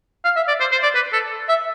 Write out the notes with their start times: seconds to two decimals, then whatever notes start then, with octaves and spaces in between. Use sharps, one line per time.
0.24 F5
0.36 E5
0.48 D5
0.60 C5
0.72 C5
0.83 D5
0.95 B4
1.13 A4
1.49 E5